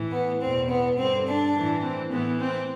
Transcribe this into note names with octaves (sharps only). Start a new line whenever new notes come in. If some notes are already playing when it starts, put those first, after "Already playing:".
Already playing: A2 E3
B3
E2 B2 C4
B3
G2 D3 C4
D4
A2 E3
C4
A2 E3 B3
C4